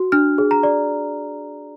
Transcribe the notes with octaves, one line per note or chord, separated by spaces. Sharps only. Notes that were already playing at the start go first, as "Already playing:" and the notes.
Already playing: F#4
D4 F6
G#4
A#5
D5